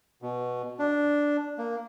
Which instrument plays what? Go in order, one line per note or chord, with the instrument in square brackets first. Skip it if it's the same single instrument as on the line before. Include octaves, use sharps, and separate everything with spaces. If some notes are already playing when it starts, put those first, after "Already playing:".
[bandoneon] B2
D4
A#3